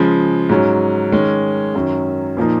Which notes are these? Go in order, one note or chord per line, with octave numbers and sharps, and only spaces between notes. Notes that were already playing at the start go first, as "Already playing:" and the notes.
Already playing: C#3 F3 G#3
G#2 F#3 C#4
D#3 G#3 C#4
F#2 D#3 F#3 C#4
A#2 F3 A#3 D#4